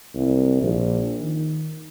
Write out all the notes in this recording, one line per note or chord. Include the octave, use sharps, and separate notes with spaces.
C2
A#1
D#3